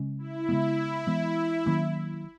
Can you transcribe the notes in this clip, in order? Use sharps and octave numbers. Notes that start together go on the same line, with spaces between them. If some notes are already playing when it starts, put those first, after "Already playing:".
Already playing: C#3 G#3 C#4
E4
C#3 G#3 B3
E3 G#3 B3
D#3 F#3 A#3 C#4